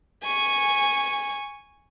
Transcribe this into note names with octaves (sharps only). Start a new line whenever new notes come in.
G#5 C#6